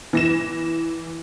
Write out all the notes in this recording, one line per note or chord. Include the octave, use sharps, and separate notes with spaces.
E3 A#6 E7